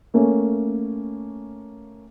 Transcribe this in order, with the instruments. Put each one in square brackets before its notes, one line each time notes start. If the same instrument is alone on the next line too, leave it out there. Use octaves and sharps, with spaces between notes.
[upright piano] A3 A#3 C#4